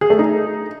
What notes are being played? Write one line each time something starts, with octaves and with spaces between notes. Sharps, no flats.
G#4
A3
D#4